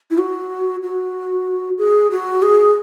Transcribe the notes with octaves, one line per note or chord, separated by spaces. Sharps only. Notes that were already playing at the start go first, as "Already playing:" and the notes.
E4
F#4
F#4
G#4
F#4
G#4